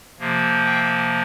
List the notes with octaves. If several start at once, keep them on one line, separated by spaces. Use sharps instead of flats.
C3 F3 A#3
E5 G5